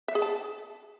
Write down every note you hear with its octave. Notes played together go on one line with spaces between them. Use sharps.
E5
G#4
A5